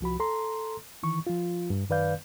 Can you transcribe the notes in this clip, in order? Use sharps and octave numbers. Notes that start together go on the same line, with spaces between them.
C2 F3 F#4 B5
A4 A#5 C6
D#3 E3 C#6
F3 F4
G2
F#2 D#3 B4 D5 F5 G6